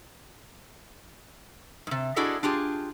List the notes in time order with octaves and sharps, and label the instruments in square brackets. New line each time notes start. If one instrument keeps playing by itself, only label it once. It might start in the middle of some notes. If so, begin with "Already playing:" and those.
[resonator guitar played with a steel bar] G#2 C3
D4 E4 F#4 G#4 A4 D#5
D4 F4 G4 G#4